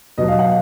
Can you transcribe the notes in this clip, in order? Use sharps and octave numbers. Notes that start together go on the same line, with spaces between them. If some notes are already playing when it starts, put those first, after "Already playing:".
B2 F#3 D#5
F5
F#5